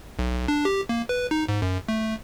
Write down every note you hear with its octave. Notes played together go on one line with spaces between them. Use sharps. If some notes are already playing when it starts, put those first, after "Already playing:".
B1
D4
G4
A#3
B4
D#4
G#2
F#2
A3